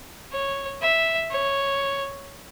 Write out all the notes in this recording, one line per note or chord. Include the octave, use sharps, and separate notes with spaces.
C#5
E5
C#5